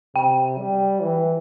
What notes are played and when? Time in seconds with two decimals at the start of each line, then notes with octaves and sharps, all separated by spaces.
0.15 C3 G5
0.58 G3
1.01 E3